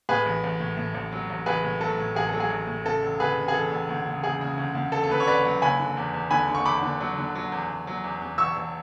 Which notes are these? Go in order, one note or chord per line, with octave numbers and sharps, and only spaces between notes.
A2 G#4 B4
A1
A1
A2
A2
A1
F#3
A1
A1 G#4 B4
A2
F#3 A4
A2
A1 G#4
F#3 A4
G#4
A1
A2
C#3 A4
E1
D2 G#4 B4
E1
G#4
E1 A4
E1
D2
C#3
C#3 G#4
C#3
D2
D2
E1 A4
A4
D2 B4
C#5
E1 B4 D5
F#3
F#1 G#5 B5
D3
E2
E2
D3 G#5 B5
D3
C#6
E2 B5 D6
D3
F#3
D3
F#3
E2
E2
F#3
E2
E2
E1 C#6 E6
E1